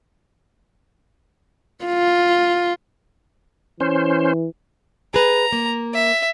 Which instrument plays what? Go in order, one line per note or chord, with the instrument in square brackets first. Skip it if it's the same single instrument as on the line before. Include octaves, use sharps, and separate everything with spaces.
[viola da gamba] F4
[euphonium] E3 [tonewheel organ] C#4 C5
[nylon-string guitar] G#4 B4 [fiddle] A#5
[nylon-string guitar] A#3
[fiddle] E5